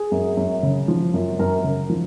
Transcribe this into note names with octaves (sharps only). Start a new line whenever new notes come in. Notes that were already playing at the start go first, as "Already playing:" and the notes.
Already playing: G#4
F#2
F#2
C#3
F3
F#2
F#2 A#4
C#3
F3